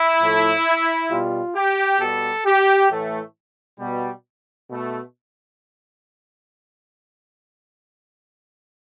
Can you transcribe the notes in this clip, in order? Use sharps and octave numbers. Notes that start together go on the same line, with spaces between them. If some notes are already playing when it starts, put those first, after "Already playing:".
Already playing: E4
A2 F3 A3
B2 G3 F4
G4
B2 G3 A4
G4
A2 E3 A3
B2 G3
B2 A3